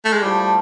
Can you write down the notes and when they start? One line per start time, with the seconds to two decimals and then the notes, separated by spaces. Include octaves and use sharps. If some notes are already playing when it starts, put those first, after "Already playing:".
0.05 A3
0.13 G#3
0.22 A2 F3 G3 A3